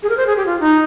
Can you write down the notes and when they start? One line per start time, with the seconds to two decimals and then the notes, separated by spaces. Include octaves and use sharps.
0.03 G#4
0.09 A#4
0.17 C5
0.27 G#4
0.37 G4
0.46 F4
0.60 D#4